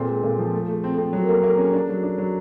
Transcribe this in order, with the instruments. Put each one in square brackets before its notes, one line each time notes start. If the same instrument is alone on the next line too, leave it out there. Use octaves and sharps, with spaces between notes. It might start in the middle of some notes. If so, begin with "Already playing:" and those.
Already playing: [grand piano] A#2 C4 [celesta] G#4 A4 B4
[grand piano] G#3
[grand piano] A#2 [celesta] A4
[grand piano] F3
A3
[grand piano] A3 [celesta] G#4
[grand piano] C4
[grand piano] C4 [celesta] A4
[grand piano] F#3
[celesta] A#4
[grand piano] A#3 [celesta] A4
[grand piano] A#3 [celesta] A4
[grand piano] C#4 [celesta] G#4
[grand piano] D4
F#3
D4
F#3